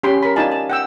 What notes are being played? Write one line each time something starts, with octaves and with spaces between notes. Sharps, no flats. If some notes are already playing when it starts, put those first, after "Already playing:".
C#4 G4 C#5 B5 C6
A#4 B5
D#4 F4 D5 G#5 A5
A5
F#5 G5 E6